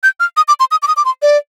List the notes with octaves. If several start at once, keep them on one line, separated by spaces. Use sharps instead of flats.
G6
F6
D#6
D6
C6
D#6
D6
D#6
D6
C6
D5